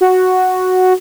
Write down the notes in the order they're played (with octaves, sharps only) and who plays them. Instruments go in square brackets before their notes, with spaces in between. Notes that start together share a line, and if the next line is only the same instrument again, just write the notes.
[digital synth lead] F#4